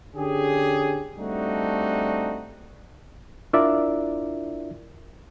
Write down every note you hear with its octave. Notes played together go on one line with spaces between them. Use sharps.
D3 C#4 G4 G#4
G3 A3 C4 D4 D#4 F#4
D4 E4 F4 A#4 D5 E5